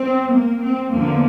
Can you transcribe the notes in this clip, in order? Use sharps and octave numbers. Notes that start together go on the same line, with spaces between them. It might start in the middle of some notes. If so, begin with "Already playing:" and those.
Already playing: C4
A#3
C4
E2 D3 F3 A#3